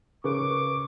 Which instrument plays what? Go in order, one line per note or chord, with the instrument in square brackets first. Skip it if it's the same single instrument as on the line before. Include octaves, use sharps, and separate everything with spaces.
[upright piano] C#3 [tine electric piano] A#4 B4 [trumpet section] C#6 D6